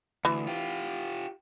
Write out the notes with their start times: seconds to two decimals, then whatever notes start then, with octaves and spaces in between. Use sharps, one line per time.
0.25 D2 E3
0.47 F4 G4